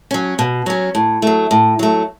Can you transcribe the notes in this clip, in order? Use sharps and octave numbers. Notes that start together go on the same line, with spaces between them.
F#3 C#4
B2
F#3 C#4
A2
F#3 A3
A2
F#3 A3